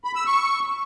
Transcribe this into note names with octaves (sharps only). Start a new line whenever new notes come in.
B5
E6
C#6